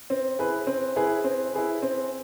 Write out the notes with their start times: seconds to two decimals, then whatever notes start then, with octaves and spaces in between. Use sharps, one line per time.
0.10 C4
0.39 E4 G#4 B4
0.67 C4
0.96 E4 G#4 B4
1.24 C4
1.54 E4 G#4 B4
1.82 C4